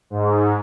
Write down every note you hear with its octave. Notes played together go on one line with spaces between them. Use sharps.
G#2